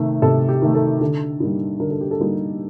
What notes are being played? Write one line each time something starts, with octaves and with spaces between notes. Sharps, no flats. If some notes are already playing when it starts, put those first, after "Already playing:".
Already playing: C3 D#3 A3
C3 A4
G4
D#3 A3
A4
D3 A4
G3 A#3 D#4
D3 A#4
A4
G4
A4
G3 A#3 D#4